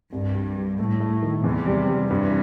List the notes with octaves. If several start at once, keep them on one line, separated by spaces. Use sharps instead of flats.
C2 G2
G3
G3
A2 A3
A3
D#3
E2 C3
G3
G3
G2 C3 E3